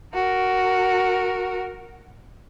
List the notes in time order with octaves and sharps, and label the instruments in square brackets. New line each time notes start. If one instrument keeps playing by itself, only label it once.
[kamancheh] F#4 A#4